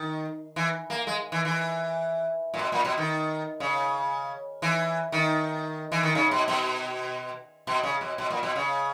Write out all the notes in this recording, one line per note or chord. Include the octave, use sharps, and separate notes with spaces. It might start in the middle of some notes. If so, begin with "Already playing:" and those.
Already playing: D#3
E3
A#3
G#3
E3
E3
A#2
B2
A#2
B2
D#3
C#3
E3
D#3
E3
D#3
C#3
B2
B2
B2
C#3
B2
B2
A#2
B2
C#3